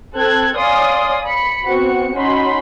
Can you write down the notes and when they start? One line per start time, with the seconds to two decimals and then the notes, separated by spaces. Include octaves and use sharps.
0.15 C4 A4 F#6 G#6
0.57 C#5 D5 F5 G#5 C6 D#6
1.25 B5 C#7
1.66 B3 C4 F#4 C#7
2.14 C#4 D#4 F#4 B5 C6